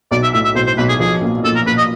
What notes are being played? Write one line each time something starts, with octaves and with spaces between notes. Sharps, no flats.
B1 D5
E5
A2 E5
E5
B1 C5
C5
B1 B4
G#4
F3 G#4
A#2
A#2 A4
A#4
A#2 B4
D#5